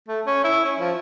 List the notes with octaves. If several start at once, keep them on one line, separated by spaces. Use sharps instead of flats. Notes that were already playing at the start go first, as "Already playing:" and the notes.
A3
C#4
E4
C#4
F3